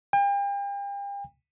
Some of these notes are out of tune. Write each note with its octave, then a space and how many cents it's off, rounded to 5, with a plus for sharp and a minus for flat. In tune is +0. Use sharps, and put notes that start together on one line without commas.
G5 +40